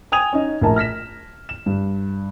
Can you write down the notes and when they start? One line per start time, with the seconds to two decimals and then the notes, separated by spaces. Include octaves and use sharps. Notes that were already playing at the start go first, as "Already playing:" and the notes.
0.12 G5 G#5 D#6 G#6 D#7 F7
0.33 C#4 D#4 D#5
0.61 A#1 A2 A#4 A5 A#5
0.76 F6 A#6 B6 E7
1.49 E7
1.66 G2